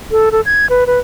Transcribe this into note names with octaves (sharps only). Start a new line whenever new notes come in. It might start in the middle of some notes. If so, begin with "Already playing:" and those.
A4
A4
G#6
B4
B4